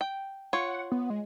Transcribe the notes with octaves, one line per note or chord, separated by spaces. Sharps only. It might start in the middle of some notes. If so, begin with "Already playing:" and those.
G5
F4 C#5 F#5
B3
G#3